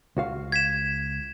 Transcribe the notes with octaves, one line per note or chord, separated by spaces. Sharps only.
C#2 F#4 F5
G#6 B6 E7